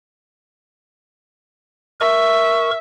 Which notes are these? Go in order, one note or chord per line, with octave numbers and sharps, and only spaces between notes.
A#4 E5 C#6